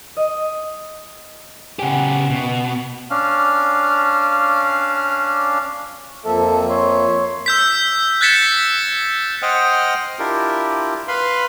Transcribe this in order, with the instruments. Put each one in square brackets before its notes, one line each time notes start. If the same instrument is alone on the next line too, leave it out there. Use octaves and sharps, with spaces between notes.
[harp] D#5
[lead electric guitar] C#3 G4 [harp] F#5 G#5
[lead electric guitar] B2
[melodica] C#4 D4 F5
[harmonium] F2 A#3 E5 [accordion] F3 A4
[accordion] C#5 C6
[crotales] E6 G6 B6
F#6 G#6 A6 B6 C#7 E7
[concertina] C5 D#5 F#5 G5 D#6 F6
D4 E4 F4 G4 A#4
B4 F5 B5 C6